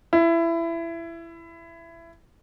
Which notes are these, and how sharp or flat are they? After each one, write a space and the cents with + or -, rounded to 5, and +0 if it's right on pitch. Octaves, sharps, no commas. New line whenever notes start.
E4 +20